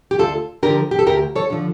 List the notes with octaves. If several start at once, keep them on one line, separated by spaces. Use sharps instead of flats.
G4
D2 F4 A4
D3 F3 G4 A#4
G4
A4
D2 G4 A#4
A4 C#5
D3 F3